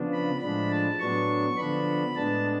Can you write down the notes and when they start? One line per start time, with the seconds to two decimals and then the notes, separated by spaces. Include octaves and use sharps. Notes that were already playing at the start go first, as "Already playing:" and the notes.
Already playing: C#3 F3 B3 D4
0.13 B5
0.41 A2 F3 G#3 D4 B5
0.71 A5
1.00 A2 F#3 B3 D4 C#6
1.57 D3 F3 B3 D4 B5
2.15 A2 G#3 B3 D4 A5